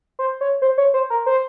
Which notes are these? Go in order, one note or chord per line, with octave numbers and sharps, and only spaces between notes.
C5
C#5
C5
C#5
C5
A#4
C5